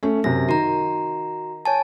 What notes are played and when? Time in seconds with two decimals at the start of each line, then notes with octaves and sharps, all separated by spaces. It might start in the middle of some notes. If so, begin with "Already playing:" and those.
0.03 A3 C#4
0.24 F#2 C3 A#6
0.49 D#3 F#4 A#5
1.65 C#5 G#5 A5